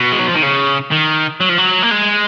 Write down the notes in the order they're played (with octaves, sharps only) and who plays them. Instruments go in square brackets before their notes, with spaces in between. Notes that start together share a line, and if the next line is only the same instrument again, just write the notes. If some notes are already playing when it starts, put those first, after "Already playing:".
Already playing: [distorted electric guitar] B2
G#3
F#3
F3
D#3
C#3
D#3
F#3
F3
F#3
A#3
G#3